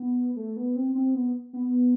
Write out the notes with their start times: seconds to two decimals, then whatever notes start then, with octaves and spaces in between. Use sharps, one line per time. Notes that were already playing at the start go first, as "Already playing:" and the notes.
Already playing: B3
0.36 A3
0.57 B3
0.76 C4
0.95 C4
1.15 B3
1.53 B3